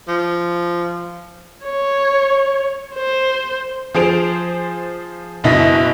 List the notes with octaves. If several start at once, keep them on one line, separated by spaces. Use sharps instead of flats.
F3
C#5
C5
F3 G#4 C5 D7 F7
F#1 B2 E4 D#5 A#6 B6